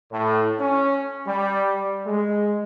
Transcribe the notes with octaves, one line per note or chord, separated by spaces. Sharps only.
A2
C#4
G3
G#3